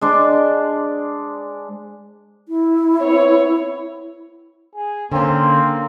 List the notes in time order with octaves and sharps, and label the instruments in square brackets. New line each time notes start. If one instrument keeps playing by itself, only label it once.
[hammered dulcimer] G#3 D4 C5 D5
[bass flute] E4
[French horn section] B3 C4 C#5
[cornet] G#4
[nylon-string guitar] D3 C#4 [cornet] A#3 [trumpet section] C4